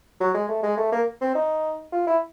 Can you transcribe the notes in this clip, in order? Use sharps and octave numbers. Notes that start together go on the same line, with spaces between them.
F#3
G#3
A3
G#3
A3
A#3
C4
D#4
F4
E4